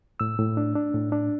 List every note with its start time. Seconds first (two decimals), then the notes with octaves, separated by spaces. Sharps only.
0.20 A2 E6
0.39 A2
0.57 D4
0.75 D4
0.94 A2
1.12 D4